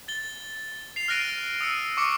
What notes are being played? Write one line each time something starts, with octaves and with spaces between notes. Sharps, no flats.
A6 G7
C7 F7
F6 F#6 A#6 D7 D#7
D#6 E6 C#7 D#7
C#6 D6 C#7